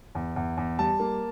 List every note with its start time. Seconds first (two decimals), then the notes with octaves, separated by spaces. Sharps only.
0.15 E2
0.36 E2
0.57 E2
0.79 G3 A5
1.00 A#3